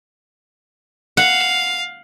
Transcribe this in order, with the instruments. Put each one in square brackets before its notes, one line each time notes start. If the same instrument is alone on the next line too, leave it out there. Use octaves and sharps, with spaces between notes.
[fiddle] F5 [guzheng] F#5